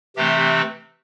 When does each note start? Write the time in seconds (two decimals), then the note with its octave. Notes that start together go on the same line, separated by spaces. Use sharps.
0.17 C3 E3 A3 C4 G4